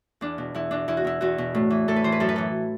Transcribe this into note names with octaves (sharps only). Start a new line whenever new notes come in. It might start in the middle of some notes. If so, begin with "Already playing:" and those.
E2 D4
B2
E2 E4
B2 D4
E2 E4
F#4
B2 E4
E2 F#4
B2
A2
E3
A2 A4
B4
E3 C5
B4
F#2 A4
B4
E3 A4